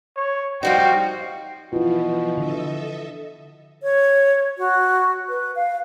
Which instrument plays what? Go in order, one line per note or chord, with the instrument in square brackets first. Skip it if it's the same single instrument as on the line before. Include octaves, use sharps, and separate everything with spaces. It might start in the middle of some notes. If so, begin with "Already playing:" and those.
[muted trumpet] C#5
[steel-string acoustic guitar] F3 G3 D#4 [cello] F#4 F5 [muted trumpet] G5
[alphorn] B2 [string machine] E3 F3 [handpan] E4 F4
[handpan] D3 [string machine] A4 D#5 E5
[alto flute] C#5
F#4
B4
F5